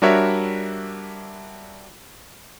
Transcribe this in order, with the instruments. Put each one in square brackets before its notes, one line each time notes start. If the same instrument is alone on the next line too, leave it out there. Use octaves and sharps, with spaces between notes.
[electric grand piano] G3 D4 F#4 A#4 C#5 E5